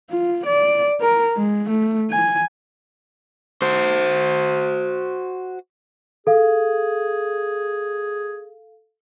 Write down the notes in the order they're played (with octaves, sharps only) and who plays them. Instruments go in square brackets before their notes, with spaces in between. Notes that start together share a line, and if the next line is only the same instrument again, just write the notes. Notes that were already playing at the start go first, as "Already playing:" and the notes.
[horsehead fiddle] F4
D5
A#4
G#3
A3
G#5
[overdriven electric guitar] F#4 C5
[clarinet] G#4 [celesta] A4 F5